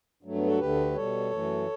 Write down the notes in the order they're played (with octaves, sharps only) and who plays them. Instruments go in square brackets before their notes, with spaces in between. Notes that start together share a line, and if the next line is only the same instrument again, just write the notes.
[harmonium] G2 F#3 A3
B3
F#4 A4
D2 D3 A3 G4 B4
B2 G3 A4 C#5
F#2 E3 A3